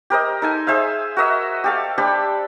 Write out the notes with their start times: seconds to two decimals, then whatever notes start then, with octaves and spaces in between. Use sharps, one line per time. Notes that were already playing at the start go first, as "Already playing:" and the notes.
0.10 G4 A#4 C5 D#5
0.42 D#4 A4 G#5
0.67 G#4 C5 E5 F5
1.17 F#4 A#4 D#5 E5
1.64 G4 A4 F5
1.98 D4 G4 C5 B5